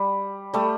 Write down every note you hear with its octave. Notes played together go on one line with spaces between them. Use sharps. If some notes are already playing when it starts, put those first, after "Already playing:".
Already playing: G3
G3 A3